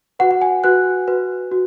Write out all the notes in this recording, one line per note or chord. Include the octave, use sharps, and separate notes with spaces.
F#4 B4 F#5
F#5
G#5
F#4 B4 F#6
F#4 B4
F#4